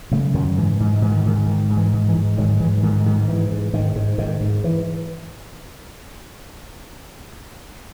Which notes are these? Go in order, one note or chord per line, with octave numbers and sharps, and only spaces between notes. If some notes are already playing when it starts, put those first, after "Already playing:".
C#3 F#3 A3
F#2 D#3 F#3
G#2 E3
G#2
G#2 E3
D#3
G#2 D#3
G#2 D#3
G#2
E3
G#2
E3
G#2
G#2 D#3 F#3
G#2 E3
G#2 D#3
G#2 D#3
G#2 E3
G#2
G#2 D#3
G#2
G#2 D#3
G#2
E3